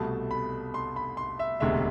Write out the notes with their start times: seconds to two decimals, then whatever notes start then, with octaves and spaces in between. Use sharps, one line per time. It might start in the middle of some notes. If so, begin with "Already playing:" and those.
Already playing: C2 B2 A3 A5
0.31 B5
0.74 C6
0.96 B5
1.17 C6
1.39 E5
1.60 E1 D2 C3 G#3 E5